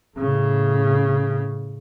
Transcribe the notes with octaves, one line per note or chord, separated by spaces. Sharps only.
A2 C#3